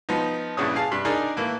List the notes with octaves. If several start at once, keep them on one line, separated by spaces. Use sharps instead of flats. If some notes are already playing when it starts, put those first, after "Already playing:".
F3 B3 D#4
A#1 G2 C#3 E3 C#5 D#6
G#4 F5 A5
G2 C3
D4 D#4 G#4 A#4 D5
A2 E3 A#3